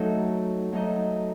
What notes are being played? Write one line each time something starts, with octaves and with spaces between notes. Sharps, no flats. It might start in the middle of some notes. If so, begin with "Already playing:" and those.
Already playing: F#3 A3 D#4 A4 D#5
F#3 A3 D#4 A4 D#5